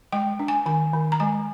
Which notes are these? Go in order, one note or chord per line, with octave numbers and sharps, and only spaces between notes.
G#3 G5
D4
G#5
D#3 G#5
D#3
A#5
G#3 G#5